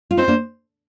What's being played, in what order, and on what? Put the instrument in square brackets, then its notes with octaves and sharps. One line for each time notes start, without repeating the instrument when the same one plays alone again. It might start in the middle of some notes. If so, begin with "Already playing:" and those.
[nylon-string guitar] F4
[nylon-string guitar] C4 D#4 [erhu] C5
[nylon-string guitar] A#3 D4